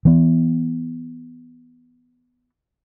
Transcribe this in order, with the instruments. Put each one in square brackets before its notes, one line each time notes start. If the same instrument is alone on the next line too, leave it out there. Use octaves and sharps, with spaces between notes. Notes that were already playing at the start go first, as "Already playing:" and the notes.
[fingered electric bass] E3 B3